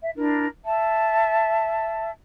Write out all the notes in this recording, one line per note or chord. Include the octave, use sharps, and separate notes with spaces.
E5
D4 E4 A#4
E5 A5